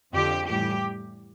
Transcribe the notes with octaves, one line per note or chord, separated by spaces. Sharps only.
F2 D3 F3 G4
A2 E3 G3 G4